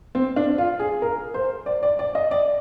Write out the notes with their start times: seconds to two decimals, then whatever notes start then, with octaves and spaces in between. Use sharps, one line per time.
0.15 C4
0.36 D4
0.58 F4
0.79 G#4
1.02 A#4
1.34 C5
1.66 D5
1.83 D5
1.99 D5
2.15 D#5
2.31 D5